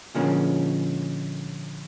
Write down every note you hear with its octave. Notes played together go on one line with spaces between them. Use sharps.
A#2 D3 F3 G#3 A#3 C#4